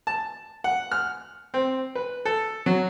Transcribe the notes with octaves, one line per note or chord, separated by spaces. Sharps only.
A5
F#5
F6
C4
B4
A4
F#3